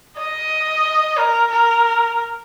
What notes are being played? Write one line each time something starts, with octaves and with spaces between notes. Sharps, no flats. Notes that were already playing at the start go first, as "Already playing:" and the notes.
D#5
A#4
A#4